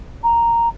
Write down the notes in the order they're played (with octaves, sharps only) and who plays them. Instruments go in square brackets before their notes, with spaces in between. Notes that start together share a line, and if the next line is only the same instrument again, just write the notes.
[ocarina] A#5